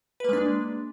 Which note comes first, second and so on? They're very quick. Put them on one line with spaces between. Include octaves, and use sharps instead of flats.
B4 A#3 G#3 D4